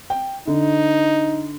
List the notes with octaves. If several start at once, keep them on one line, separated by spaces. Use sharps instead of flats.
G5
D3 D#4